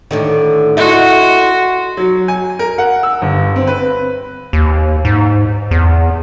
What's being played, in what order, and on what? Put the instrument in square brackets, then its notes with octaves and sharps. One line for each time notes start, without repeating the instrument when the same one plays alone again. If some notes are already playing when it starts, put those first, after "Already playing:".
[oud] A2 D3 D#3
[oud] E4 A4 D#5 [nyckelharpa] F#4 C6
[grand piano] F#3
G#5
A#4
F#5
E6
G1
C4
B4
[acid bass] D#2
G#2
E2